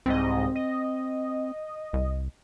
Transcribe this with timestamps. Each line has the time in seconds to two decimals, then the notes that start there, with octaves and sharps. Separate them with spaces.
0.06 C2 G#2 C4 D#5
0.55 D#5
1.93 C2